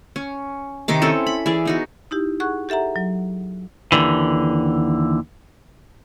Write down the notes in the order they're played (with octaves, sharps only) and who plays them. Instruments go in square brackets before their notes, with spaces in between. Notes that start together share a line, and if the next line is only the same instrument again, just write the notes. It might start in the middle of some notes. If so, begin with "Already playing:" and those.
[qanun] C#4
C3 D#3 D#4 D6
C4 C#4 E4 A4
B5
E3 G#4 D5
B3 D#4 F#4
[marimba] D#4 E4 G4
G#4 F#5 C#6 F#6
G4 A4 E5 F#5 A#5
F#3
[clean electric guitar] D#2 D3 E3